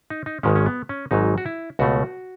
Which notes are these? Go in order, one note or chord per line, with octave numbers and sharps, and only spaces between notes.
D#4
D#4
G#1 G#2 D#3 G#3 C#4
C#4
B3
C#4
G#1 G#2 F#3 D#4
F#4
E4
C#2 B2 A3 F#4